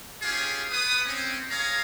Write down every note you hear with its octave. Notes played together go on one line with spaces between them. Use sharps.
C#4 F4 G4 G#4
B3 B4 D#6
C4 C#4
G#4 C#5 F5 A#5